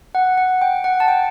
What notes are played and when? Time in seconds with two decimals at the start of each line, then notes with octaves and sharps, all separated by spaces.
0.15 F#5
0.38 F#5
0.62 G5
0.84 F#5
1.00 A5
1.08 G5